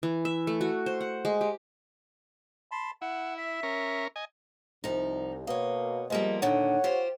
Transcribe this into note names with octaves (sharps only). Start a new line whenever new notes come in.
E3
E5
A3
F#4
C5
F#5
G#3
G4
A5 B5 C6
E4 F#5
E5
C#4 A#4
D#5 G#5
C2 F3 D#4
B2 A#3 C#5 D#5
F3 G3 G#3 A#3 B3
D#2 A#2 D3 C#5 F#5
F4 G4 C5